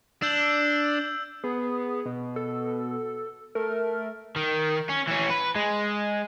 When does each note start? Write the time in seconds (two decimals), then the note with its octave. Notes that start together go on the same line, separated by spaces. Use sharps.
0.22 D4 E6 G6 F#7
1.44 B3 G#4
2.06 B2
2.36 A4
3.55 A3 A#4
4.36 D#3
4.90 C#4
5.08 E3 C#4
5.30 B4
5.56 G#3